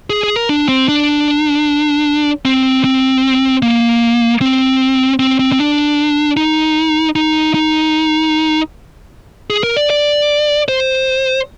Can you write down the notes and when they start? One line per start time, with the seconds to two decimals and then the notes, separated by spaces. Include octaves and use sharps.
0.10 G#4
0.23 G#4
0.36 A#4
0.49 D4
0.69 C4
0.89 D4
2.45 C4
2.84 C4
3.63 A#3
4.41 C4
5.20 C4
5.39 C4
5.52 C4
5.59 D4
6.37 D#4
7.16 D#4
7.54 D#4
9.50 G#4
9.63 A#4
9.76 D5
9.90 D5
10.68 C5